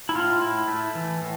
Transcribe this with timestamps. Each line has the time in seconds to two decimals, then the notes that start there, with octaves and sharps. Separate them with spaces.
0.09 E4
0.15 A2 F4
0.42 E4
0.68 A3
0.95 E3
1.21 A2